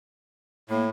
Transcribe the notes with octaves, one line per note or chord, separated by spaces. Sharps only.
A2 A#3